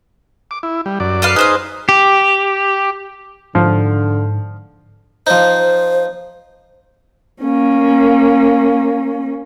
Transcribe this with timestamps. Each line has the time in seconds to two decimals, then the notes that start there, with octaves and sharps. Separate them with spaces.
0.51 D6
0.63 E4
0.86 G3
1.00 F#2 D5
1.22 A4 B4 F5
1.36 D#4 G#4 B4 C5 D#5 F5
1.89 G4
3.55 G#2 D3 F3
5.27 F3 D#4 C5
7.42 A#3 C#4